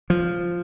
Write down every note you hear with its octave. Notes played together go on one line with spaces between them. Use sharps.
F3